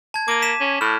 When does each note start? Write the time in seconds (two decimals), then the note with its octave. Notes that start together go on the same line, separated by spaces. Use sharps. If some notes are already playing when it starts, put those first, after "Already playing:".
0.14 A5 G#6
0.28 A#3 D6 D#7
0.42 B6 D#7 E7
0.61 C#4
0.81 A2 F6